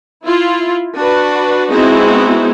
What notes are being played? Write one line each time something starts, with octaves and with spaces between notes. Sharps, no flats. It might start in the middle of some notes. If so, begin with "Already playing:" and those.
E4 F4
D4 F#4 B4
G#3 B3 C4 D#4 E4 F#4